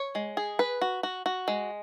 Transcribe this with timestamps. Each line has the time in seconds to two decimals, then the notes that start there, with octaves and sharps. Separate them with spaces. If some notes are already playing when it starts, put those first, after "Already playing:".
Already playing: C#5
0.15 G#3
0.37 G#4
0.59 B4
0.81 F#4
1.03 F#4
1.26 F#4
1.48 G#3